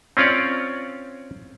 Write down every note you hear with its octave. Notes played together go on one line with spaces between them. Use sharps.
C4 C#4 F4 C#5 D5